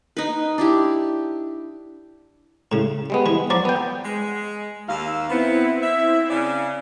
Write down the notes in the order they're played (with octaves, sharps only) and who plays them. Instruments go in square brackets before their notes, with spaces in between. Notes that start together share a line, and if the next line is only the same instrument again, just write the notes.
[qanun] D#4 B4
D4 E4 G4
[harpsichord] A2 C#3
[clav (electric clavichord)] G3 G#3 B3
[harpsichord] E3
[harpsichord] F3 F#3 [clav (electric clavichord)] D5
[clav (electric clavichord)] B3 G5
[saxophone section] G#3
[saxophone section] D#2 F5 [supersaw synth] E6
[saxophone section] B3 [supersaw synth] C4 E4
[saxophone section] E5
C#3 D5